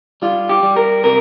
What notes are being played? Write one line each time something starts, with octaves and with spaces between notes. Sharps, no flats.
G3 F4
G4
G3
A#4
C3 A#4